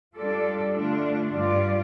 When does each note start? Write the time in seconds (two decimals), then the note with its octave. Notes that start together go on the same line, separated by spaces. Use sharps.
0.16 G3 D4 F4 A4 D5
0.74 D3 A3 D4 F4
1.33 G2 G3 F4 D5